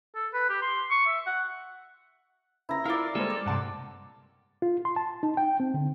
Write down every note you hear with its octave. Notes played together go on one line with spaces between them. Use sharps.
A4
B4
G4
C6
C#6
E5
F#5
C#2 E4 A#5
E4 F4 A#4 D5 F5 A#5
G3 G#3 A#3 A4 C5
D5
G2 C3 F#5 A5 C6
F4
C6
A5
D#4
G5
C4
D3